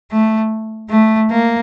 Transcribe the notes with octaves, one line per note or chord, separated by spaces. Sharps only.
A3
A3
A#3